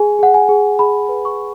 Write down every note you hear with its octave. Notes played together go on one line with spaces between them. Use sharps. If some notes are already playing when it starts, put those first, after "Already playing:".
Already playing: G#4 G#5
G#4 F#5
G#5
G#4
G#4 B5
B4
C#6